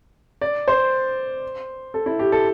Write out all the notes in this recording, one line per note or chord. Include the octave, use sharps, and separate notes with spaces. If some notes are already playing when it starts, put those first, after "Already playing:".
D5
C5
A4
E4
G4
A4